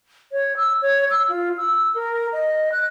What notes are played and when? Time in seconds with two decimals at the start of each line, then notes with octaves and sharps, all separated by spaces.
0.32 C#5
0.57 E6
0.82 C#5
1.11 E6
1.29 F4
1.58 E6
1.95 A#4
2.33 D#5
2.72 F#6